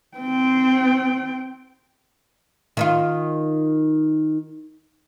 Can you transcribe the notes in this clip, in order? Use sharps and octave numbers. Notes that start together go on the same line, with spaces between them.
C4 G5
D#3 D#4 F4